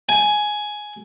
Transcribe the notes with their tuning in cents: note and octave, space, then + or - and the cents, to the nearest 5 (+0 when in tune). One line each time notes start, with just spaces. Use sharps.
G#5 +10